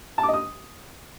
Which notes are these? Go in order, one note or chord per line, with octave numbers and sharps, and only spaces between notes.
A5
D6
D#5
D#6